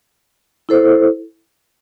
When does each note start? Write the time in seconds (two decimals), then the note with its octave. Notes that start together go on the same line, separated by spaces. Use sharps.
0.69 E4 A4 C5